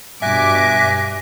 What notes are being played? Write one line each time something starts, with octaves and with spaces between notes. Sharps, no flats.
G2 B2 E5 G#5 D6 F#6 A#6 B6